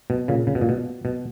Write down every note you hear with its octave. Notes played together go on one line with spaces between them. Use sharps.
B2
A#2 C#3
C#3
B2
A#2
B2
B2